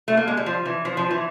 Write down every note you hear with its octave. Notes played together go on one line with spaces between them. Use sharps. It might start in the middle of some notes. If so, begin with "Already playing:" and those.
A3
A#3
G#3
G3
F3
E3
F3
F3
E3